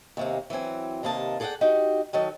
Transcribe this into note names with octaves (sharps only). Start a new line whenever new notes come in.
D#2 C3 A#3
E3 F#3 C4 G#5
D#2 C3 A#3 D#5 A5
G#4 A4 D5 D#5 F#5 G5
D#4 F#4 G4
D#3 F#3 D#4 A4